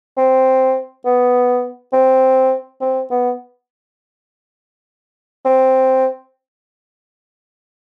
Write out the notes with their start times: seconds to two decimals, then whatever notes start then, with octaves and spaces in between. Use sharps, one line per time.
0.17 C4
1.05 B3
1.93 C4
2.81 C4
3.10 B3
5.45 C4